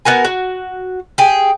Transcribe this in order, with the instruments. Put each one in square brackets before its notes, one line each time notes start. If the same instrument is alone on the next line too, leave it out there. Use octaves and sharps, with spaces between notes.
[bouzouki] B3 F#4 A#4 G#5
F#4
G4 G#4